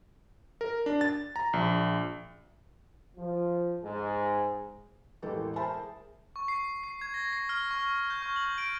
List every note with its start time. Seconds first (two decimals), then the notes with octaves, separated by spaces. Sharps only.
0.61 A#4
0.86 D4
1.01 A6
1.36 A#5
1.53 A#1
3.17 F3
3.84 G#2
5.22 E1 A1 E3 A#3 G4 A4
5.56 A#4 C5 E5 A5 B5
5.74 G#4
6.36 C#6
6.48 C7
6.83 C7
7.01 G#6
7.14 A#6
7.33 C7
7.49 F6
7.71 C#6
8.10 G6
8.22 C#6
8.36 F#7
8.58 D7